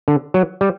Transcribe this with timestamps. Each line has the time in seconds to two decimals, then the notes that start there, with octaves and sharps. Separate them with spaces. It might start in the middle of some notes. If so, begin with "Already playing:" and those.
0.08 D3
0.34 F#3
0.61 G3